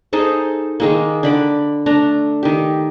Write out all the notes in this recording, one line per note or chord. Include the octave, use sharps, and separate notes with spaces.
D#4 G#4 A4 C5
D#3 G#3 A#3
D3 B5 D6
A3 D4 A#5
D#3 G4